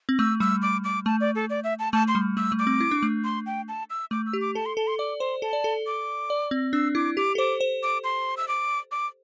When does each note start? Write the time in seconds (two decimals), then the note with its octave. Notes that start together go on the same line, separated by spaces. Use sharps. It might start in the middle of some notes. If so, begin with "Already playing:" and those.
0.09 C4
0.19 A3 E6
0.40 G3 E6
0.62 D6
0.84 D6
1.06 A3 A5
1.21 D5
1.35 A4
1.50 D5
1.64 E5
1.79 A5
1.93 A3 A5
2.08 C6
2.15 G3
2.37 A3 E6
2.52 A3
2.59 D6
2.67 C4
2.80 E4
2.91 D4
3.03 A3
3.24 C6
3.46 G5
3.68 A5
3.90 E6
4.11 A3 D6
4.26 E6
4.33 G4
4.41 D6
4.55 A4 A5
4.66 C6
4.77 A4 A5
4.87 C6
4.99 D5 D6
5.20 C5 C6
5.42 A4 A5
5.53 D5
5.64 A4
5.86 D6
6.30 D5
6.51 C4
6.73 D4 E6
6.95 E4 D6
7.17 G4 D6
7.35 A4
7.38 C5 D6
7.60 C5
7.83 D6
8.04 C6
8.37 E6
8.48 D6
8.91 D6